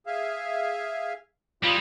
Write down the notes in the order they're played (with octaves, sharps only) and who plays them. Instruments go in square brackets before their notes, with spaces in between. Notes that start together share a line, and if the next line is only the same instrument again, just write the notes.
[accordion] G#4 E5 F5
[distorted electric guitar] G3 G#4 [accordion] C4 F4